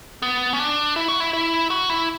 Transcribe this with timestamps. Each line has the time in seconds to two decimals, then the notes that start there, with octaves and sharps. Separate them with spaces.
0.22 B3
0.53 C#4
0.59 D4
0.96 E4
1.08 F#4
1.20 E4
1.33 E4
1.70 F#4
1.89 E4